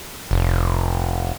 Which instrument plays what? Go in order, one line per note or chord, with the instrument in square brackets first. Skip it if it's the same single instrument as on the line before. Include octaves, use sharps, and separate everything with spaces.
[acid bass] F1